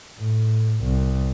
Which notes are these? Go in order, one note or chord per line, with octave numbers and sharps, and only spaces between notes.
A2
C2